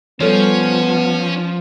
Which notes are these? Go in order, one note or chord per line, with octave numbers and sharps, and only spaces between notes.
F3 G3 B3 C#4 A4 C#5